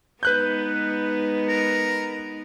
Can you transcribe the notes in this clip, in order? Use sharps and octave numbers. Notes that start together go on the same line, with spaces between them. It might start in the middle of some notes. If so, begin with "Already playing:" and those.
G#3 B3 D#4 B4 F#6 G6
A#4